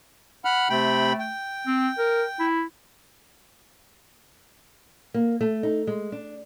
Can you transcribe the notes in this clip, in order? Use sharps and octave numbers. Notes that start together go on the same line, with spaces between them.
F#5 B5 F6
C3 A3 G5 B5
G5
C4
A#4
E4
A#3
A3
D#4
G#3
D4